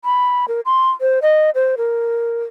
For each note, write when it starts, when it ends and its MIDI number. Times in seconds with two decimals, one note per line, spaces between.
0.04 0.45 83
0.48 0.61 70
0.65 0.90 84
1.01 1.19 72
1.22 1.50 75
1.55 1.75 72
1.77 2.44 70